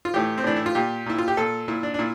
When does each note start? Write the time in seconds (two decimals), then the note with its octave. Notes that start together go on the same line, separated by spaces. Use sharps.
0.05 F4
0.14 A2 E3 G4
0.38 C4
0.44 A2 E3 D4
0.56 E4
0.66 F4
0.75 A#2 G4
1.06 A#2 E4
1.18 F4
1.28 G4
1.37 A#2 A4
1.68 A#2 E4
1.83 D4
1.94 D4
1.99 A#2 E4